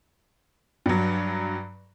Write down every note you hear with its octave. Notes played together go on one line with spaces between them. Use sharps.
G2 F#3